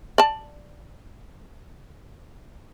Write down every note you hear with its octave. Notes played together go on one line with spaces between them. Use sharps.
D5 A5